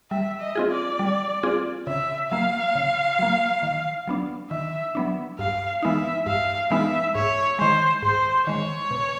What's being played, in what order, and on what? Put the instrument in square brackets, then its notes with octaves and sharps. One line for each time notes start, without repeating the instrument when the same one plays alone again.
[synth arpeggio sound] G3 [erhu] E5
[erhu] D#5
[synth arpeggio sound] C4 F4 G#4
[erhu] D5
[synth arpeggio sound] G3
C4 F4 G#4
[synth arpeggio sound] C#3 [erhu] E5
[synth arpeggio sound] F#3 A#3 [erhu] F5
[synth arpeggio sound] C#3
F#3 A#3
D#3
F#3 B3 D4
[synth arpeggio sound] D#3 [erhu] E5
[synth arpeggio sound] F#3 B3 D4
[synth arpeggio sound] G2 [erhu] F5
[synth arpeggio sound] E3 G#3 B3 D#4 [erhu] E5
[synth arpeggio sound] G2 [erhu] F5
[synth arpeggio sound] E3 G#3 B3 D#4 [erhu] E5
[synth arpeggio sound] G#2 [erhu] C#5
[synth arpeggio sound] D#3 G#3 [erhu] C5
[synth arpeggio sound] G#2 [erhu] C5
[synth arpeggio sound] D#3 G#3 [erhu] C#5
[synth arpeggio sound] B2